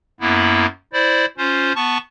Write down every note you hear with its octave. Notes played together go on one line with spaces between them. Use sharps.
F#2 A#3 B3 E4
E4 C5 D5
C#4 F4 C5
B3 A5 C#6